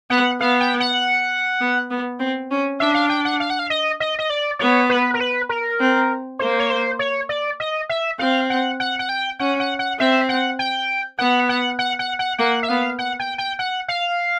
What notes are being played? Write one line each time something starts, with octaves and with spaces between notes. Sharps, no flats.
B3 F#5
B3 F5
G5
F#5
B3
B3
C4
C#4
D4 E5
F5
G5
F#5
F5
F#5
F5
D#5
D#5
D#5
D5
B3 C#5
B4
A#4
B4
A#4
C4
A#3 C5
C#5
C5
C#5
D5
D#5
E5
C4 F5
F#5
F#5
F#5
G5
C#4 F#5
F#5
F#5
C4 E5
F#5
G5
B3 F#5
F#5
F#5
F#5
F#5
A#3 F#5
E5
B3 F5
F#5
G5
G5
F#5
F5